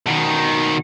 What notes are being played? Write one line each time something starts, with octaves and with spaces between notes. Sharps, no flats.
B2 D#3